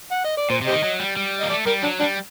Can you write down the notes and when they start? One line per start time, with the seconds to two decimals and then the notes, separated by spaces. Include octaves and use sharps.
0.11 F#5
0.24 D#5
0.37 D5
0.50 A#2 C5
0.61 C3
0.67 G4 C5 D#5
0.72 D#3
0.84 F#3
1.00 G3
1.17 G3
1.40 A#3 D#5
1.50 A3 D5
1.67 G3 A#4
1.83 F#3 D4
2.00 G3 D4